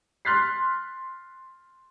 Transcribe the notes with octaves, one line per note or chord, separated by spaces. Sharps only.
C6 F6 F#6 A6 B6 C7